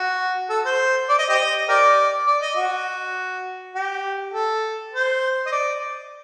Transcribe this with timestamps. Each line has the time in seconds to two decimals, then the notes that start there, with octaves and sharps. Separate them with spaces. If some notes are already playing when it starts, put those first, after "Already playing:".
Already playing: F#4
0.50 A4
0.66 C5
1.09 D5
1.19 D#5
1.29 G4 C5 D#5
1.69 G4 A#4 D5
2.27 D5
2.42 D#5
2.57 F#4
3.75 G4
4.33 A4
4.93 C5
5.46 D#5
5.51 D5